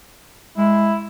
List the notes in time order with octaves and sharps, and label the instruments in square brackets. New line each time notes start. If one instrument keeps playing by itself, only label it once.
[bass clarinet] G#3 [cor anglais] E4